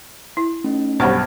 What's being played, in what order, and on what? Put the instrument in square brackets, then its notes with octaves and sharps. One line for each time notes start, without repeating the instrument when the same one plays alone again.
[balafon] E4
[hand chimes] A3 C#4 D#4
[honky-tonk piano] B1 G2 [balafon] C5 F#5 C#6 [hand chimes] F6 G#6 A#6